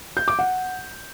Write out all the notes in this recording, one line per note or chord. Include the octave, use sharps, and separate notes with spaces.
G6
D6
F#5